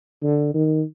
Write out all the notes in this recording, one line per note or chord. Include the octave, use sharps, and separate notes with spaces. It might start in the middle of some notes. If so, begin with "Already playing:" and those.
D3
D#3